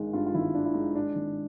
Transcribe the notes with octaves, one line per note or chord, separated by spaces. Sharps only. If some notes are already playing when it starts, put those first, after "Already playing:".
Already playing: G#1 G2 D#3 G#3
G2 F4
F4
G#1 E4
D#3 D4
E4
G#3 D#4
G#2 D4
G#1